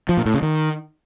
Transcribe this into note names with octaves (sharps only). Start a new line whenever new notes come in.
F3
A#2
A2
C#3
D#3